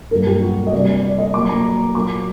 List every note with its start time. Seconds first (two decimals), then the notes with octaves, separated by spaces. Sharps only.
0.11 G2 F#3 A#3 A#4
0.27 G4
0.41 F#4
0.67 D#5
0.72 C3 G3 A#3 D5
1.03 D5
1.18 D#5
1.34 A#2 F#3 A#3 D6
1.49 A#5
1.95 A#2 F#3 A#3 D6